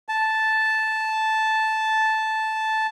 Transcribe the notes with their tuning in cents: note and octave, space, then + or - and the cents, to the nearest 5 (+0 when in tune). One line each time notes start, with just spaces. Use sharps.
A5 -5